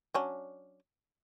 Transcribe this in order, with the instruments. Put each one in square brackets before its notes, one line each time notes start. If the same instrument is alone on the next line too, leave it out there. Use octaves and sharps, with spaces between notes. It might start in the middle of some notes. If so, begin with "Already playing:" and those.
[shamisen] F#3 C#4 D4